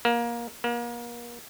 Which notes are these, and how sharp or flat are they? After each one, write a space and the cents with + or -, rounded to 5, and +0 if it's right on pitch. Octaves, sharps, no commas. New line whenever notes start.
A#3 +20
A#3 +35